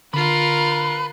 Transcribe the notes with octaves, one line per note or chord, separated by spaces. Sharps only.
D3 F4 A#4 B4